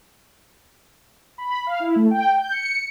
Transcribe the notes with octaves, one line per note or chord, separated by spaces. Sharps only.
B5
F5
E4
A3
G5
G6
C#7